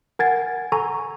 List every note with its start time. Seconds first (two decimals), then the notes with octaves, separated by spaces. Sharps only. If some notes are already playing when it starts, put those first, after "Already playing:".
0.19 A#4 F#5 G#5 G#6 A6
0.72 A4 G#5 A#5 C#6